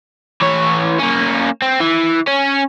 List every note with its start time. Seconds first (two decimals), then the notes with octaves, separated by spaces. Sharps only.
0.42 E3 C#5
0.99 A#3 C#4
1.62 C4
1.80 E3
2.27 C#4